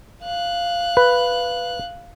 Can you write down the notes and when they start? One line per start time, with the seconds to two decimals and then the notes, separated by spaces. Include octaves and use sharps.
0.23 F5 F#6
0.97 B4